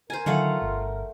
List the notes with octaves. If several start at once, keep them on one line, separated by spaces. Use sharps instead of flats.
A#4 C5 G#5
D3 D#3 F#3 A3 F4 F5 F#5
G1